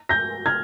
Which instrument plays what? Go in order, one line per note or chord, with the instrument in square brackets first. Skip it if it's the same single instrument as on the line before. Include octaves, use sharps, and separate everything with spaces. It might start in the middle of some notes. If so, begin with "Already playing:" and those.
[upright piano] G6 A#6
F6 G#6